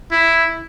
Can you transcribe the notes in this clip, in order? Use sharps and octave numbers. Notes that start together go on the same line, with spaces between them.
E4